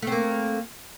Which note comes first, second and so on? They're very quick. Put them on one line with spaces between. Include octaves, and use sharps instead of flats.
A3 C4 A#3